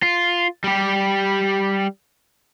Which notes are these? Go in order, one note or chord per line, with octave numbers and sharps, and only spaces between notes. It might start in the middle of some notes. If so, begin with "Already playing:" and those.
F4
G3 G4